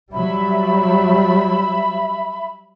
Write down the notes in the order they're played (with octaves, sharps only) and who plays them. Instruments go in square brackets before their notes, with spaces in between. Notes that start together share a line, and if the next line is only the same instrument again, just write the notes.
[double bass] F#3 G3 [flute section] E5 B5